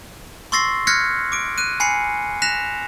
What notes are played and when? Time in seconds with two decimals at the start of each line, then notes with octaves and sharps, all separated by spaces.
0.52 C6 C#6 E6 A6 A#6 C7
0.87 F6 F#6 G#6 A#6 B6 C#7
1.32 D6 D7
1.58 F#6 D#7
1.80 G#5 B5 C7 C#7
2.42 F#6 A#6 B6 E7 F7